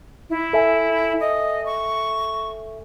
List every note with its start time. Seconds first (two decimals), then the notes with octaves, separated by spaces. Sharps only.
0.29 E4
0.53 A4 E5 G#5
1.20 D#5
1.65 C#6